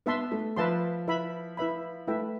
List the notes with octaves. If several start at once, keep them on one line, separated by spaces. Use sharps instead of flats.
B3 B4 E5 A5 C6
A3
F3 B4 E5 A5 C6
E4 B4 E5 B5
E4 B4 E5 B5
A3 E4 B4 E5 G5